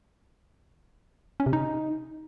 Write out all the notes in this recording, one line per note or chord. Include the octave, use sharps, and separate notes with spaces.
C#4
C3
D#4